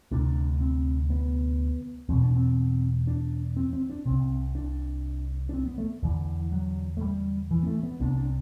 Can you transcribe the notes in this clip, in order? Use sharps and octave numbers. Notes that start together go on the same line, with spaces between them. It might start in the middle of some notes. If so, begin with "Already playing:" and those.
D2 C3 D4
C4
B3
E2 B2 C4
D4
C4
D4
C4
C4
D4
C2 C3 C4
D4
D4
C4
B3
A3
E2 D3 E3
F#3
A3
G3
E3
B3
A3
B3
C2 C3 D4
D4